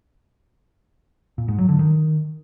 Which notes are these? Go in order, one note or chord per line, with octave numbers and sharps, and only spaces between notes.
A#2
G#2
F#3
D3
D#3